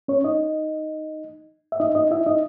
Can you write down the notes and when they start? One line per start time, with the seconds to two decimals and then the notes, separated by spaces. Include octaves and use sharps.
0.08 C#4 C#5
0.24 D#4 D#5
1.72 E5
1.80 D#4 D#5
1.95 D#4 D#5
2.11 E4 E5
2.26 D#4 D#5